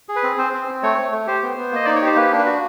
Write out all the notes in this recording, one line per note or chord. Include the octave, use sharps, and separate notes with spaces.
G#4
B4
C4
C4 C5
C4
C4
A3 C#5
A3
A3
G4 C5
B3
B3
A#3 D#5
D#4 D5
C#5
G4
C5
A#3 B4
D4
B4
F#4